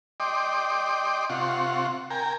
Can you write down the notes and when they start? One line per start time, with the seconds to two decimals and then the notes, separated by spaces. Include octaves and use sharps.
0.20 D5 D#5 G5 C6 D6
1.30 C3 F4 F#5 C6 C#6
2.10 A#4 G5 G#5 A#5